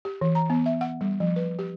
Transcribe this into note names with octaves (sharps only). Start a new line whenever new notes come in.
G4
E3
A#5
B3
E5
F#5
G3
F3
B4
G4